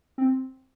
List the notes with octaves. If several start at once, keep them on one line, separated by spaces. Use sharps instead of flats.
C4